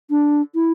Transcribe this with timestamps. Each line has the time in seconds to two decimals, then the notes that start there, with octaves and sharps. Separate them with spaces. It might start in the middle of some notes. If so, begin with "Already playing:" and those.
0.10 D4
0.55 E4